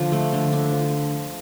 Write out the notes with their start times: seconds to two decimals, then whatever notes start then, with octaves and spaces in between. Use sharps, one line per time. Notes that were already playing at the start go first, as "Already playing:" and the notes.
Already playing: D3 F3 D4
0.12 A3
0.33 D3
0.52 D4
0.72 F3